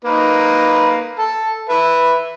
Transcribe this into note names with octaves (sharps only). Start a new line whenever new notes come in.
A#3 D#4 B4
A4
B4 E5